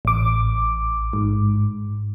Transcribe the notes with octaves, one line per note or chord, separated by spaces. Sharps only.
A1 D6
G#2